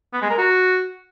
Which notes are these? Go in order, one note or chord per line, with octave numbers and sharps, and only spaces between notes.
B3
G#3
A#4
F#4